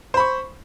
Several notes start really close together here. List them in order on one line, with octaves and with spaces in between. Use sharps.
C5 B5 C#6